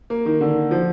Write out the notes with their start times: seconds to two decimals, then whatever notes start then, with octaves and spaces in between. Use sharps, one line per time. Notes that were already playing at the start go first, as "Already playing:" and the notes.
0.10 A#3
0.26 D#3
0.41 D3
0.71 F3